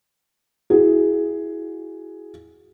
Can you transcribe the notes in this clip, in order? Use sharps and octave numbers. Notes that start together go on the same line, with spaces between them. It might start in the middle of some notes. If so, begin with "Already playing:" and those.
E4 F#4 G#4